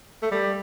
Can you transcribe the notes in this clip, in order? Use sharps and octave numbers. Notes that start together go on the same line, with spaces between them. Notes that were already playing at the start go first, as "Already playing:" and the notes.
A3
G3